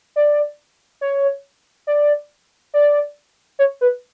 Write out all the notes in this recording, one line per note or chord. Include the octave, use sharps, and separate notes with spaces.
D5
C#5
D5
D5
C#5
B4